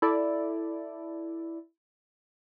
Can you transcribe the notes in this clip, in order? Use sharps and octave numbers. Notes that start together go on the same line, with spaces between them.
E4 A4 D5